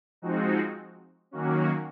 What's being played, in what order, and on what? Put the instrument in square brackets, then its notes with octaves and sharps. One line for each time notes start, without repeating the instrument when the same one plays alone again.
[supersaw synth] F3 G#3 C4 D#4 F#4
D#3 F#3 A#3 C#4 F#4